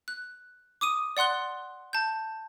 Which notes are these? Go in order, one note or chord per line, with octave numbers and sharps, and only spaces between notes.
F#6
D6 D#6 D#7
D5 F#5 C6 F#6 G7
A5 G6